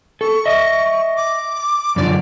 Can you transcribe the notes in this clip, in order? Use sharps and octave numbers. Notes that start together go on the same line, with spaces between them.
A4 C#6
D#5 E5
D6
F#2 D3 F3 D5